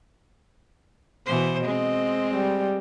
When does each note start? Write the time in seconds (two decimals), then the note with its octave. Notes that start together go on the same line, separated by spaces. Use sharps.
1.26 B2 E3 C5
1.64 G#3 C4 D#5
2.35 G3